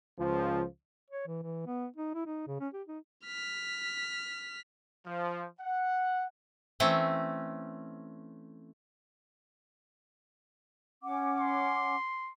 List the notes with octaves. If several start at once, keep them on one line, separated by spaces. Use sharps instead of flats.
C#2 F3
C#5
E3
E3
B3
D#4
E4
D#4
C#3
C#4
G4
D#4
F6 B6
F3
F#5
E3 A3 C4 C#4
C#4 F#5 D6
C6